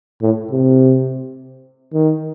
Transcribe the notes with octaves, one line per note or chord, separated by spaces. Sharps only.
A2
C3
D#3